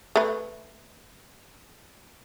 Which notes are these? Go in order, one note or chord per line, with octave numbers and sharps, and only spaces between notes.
A3 B4